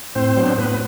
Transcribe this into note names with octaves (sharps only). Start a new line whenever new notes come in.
A2 C4 C5
F#3 B3 D4
A2 B3 B4